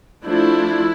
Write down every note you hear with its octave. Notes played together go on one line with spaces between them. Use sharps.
F3 A3 D4 E4